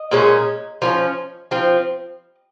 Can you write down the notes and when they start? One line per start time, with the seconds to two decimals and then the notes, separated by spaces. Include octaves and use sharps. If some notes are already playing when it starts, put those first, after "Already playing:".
Already playing: D#5
0.11 A#2 G#3 C#4
0.82 F3 A#3 C#4
1.51 F3 C4